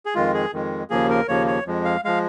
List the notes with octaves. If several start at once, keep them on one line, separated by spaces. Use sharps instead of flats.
G#4
F2 D#3 G#3 F4
G#4
F2 D#3 G#3
D#2 C#3 F3 A#3 G#4
A#4
D#2 C#3 F3 A#3 C#5
C#5
F2 F3 G#3
F5
F3 G#3 F5